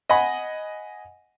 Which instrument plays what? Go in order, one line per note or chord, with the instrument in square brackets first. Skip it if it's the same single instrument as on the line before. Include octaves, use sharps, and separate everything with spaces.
[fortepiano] D#5 F#5 G#5 B5